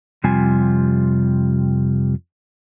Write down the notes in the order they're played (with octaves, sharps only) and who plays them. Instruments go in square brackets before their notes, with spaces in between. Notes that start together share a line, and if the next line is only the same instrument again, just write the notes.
[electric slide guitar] F2 C3 G3 F4 G#5